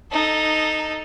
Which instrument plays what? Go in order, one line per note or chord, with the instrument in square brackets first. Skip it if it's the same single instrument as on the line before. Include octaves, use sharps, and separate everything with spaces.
[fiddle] D#4 A4